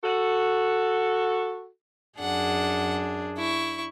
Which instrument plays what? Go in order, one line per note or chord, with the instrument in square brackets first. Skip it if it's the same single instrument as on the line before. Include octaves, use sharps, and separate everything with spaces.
[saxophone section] F#4 A4
[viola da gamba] F#2 D4 G#4 [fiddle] F#5
[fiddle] E4 C#6